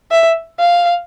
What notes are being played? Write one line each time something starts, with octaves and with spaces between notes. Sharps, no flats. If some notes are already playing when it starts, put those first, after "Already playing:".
E5
F5